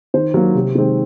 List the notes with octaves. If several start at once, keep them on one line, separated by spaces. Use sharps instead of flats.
D#3 C5
F#3 A#3
C3
D#3 G#3 C4